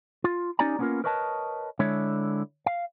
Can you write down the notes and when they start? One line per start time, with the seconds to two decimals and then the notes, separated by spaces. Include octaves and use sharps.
0.24 F4
0.59 C#4 D#4 G4 D5 G#5 A#5
0.79 A#3 B3 C#4 D4 F4 A#4
1.04 A#4 B4 C#5 D#5 G5 A5
1.79 D3 G#3 E4 C#5 E5
2.66 F5